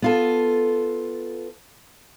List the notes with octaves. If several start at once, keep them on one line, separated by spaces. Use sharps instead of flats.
B3 F4 A4